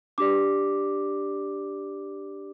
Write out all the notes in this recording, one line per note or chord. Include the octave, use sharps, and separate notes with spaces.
D4 G4 D5 D6